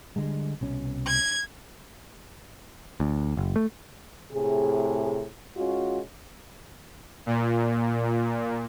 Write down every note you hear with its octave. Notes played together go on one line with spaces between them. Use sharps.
D3 G3 G#3
C2 B2 C#4
G#6
D2
F#1
A3
A2 C3 G#4
G#3 C#4 F4 F#4
A#2